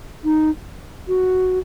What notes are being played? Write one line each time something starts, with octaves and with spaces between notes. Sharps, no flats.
D#4
F#4